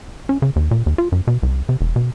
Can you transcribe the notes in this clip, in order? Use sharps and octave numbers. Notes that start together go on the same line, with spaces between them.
C#4
C#3
D#2
A#2
D#2
F4
F#2
B2
C2
C3
E1
B2